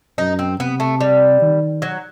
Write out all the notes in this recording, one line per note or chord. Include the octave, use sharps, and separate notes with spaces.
F#2 D#4
C4
C3 B3
A3
G3
D#3
F#3